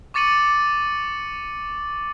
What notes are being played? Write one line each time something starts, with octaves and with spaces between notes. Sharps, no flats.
C#6 D6 A6 C#7 D#7 F#7